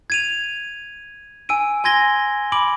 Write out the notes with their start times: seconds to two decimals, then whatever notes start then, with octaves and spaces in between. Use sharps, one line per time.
0.10 G#6 D#7 F7
1.49 G#5 E6 D7 D#7
1.84 G#5 C6 G#6 A#6 G7
2.52 B5 D6 D7 F#7